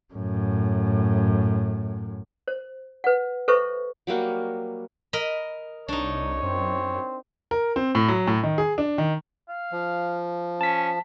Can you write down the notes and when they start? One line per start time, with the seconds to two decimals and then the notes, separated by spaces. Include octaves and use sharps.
0.14 F#2 A2
2.48 C5
3.04 B4 F#5
3.48 A4 B4 C5 E5 C#6
4.07 F#3 G3 A#3 F#4
5.13 A#4 D#5 B5
5.88 C2 D4 D#4 C#5
6.43 F#2 C4
7.51 A#4
7.76 C4
7.95 A2
8.08 F#3
8.27 A2
8.43 D#3
8.58 G#4
8.78 D4
8.98 D#3
9.49 F5
9.72 F3
10.61 C#4 A5 B6